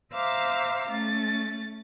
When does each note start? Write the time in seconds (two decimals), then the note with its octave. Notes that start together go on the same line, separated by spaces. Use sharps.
0.12 C5 E5 F5 A#5 D6 E6
0.90 A3 C#4 A6